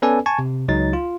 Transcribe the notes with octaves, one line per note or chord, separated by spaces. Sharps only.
B3 C#4 A4 B4 D5 G#5
G#5 A5 C#6 G#6
C3
C#2 F#3 D#4 A6
F4